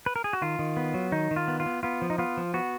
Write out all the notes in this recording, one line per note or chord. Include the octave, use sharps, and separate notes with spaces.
B4
A#4
G#4
F#4
D#3 F4
D#3
B3
F#3
D#3 D#4
D#3
F4
B3
F4
B3
B3 F4
F3
D#4
B3 F4
F3
B3 F#4